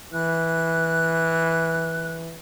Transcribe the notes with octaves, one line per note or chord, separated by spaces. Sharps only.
E3 F#6